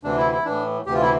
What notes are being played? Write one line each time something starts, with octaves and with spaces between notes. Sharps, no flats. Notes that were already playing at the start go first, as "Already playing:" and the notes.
D2 C3 E3 D4
E4
E4
A2 E3 D4
D2 C3 E3 G4
F4
E4